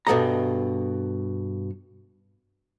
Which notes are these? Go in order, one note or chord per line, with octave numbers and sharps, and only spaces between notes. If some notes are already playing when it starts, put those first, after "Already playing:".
G2 B2 D#3 A4 D#5 A#5